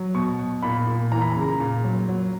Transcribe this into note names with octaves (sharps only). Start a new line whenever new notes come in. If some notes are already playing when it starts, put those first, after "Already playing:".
Already playing: F#3
B2 C#6
B2
A#2 B5
A#2
E3 A#5
B5
C#3 A#5
A#2
F#3
F#3